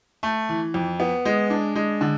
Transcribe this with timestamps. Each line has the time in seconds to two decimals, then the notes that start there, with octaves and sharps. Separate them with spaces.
0.23 A3
0.49 E3
0.74 F2
1.00 B3
1.25 G#3
1.50 D4
1.75 G#3
2.01 D3